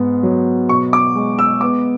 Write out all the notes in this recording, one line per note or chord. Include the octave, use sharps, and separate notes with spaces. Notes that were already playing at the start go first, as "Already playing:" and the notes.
Already playing: G#2 B3
F#3
B2 C#6
D6
G#3
E6
B3 D6